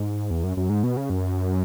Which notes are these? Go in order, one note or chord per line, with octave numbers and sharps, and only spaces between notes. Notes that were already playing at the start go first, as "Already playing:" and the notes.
Already playing: G#2
E2
F#2
F#2
G#2
B2
C#3
F#2